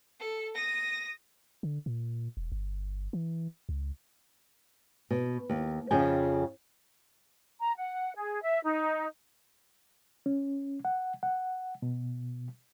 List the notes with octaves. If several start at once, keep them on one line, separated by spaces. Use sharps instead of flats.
A4
D#6 A#6
D3
A#2
E1
G1
E3
C#2
B2
D#2
F2 C#3 F3 D#5 G5 G#5
A#5
F#5
G#4
E5
D#4
C#4
F#5
F#5
B2